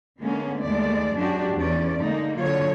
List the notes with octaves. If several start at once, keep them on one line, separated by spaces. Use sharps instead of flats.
D3 G#3 A#3 B3 C#4
D#2 G#3 A3 D5
F#2 G#3 D4 F#4 G4
E2 C#4 D5
D3 G#3 A#3 D#4
D3 F#3 F4 C#5